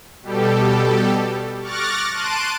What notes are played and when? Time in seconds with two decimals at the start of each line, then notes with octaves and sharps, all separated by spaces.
0.22 B2 G3 G4 A4
1.62 C#6 D6 F6 F#6 A6 A#6
2.14 A5 C6 F#6 D7 D#7